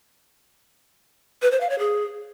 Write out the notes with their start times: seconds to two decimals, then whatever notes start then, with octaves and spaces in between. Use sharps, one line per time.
1.42 B4
1.51 C5
1.61 F5
1.70 C#5
1.79 G#4